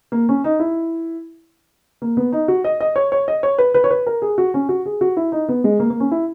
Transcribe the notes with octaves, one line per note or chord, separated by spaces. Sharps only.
A#3
C#4
D#4
E4
A#3
B3
D#4
F#4
D#5
D#5
C#5
C#5
D#5
C#5
B4
B4
C#5
B4
A#4
G#4
F#4
C#4
F#4
G#4
F#4
E4
D#4
B3
G#3
A#3
A#3
C#4
E4